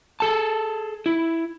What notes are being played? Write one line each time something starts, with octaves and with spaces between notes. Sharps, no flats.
G#4 A4 A5
E4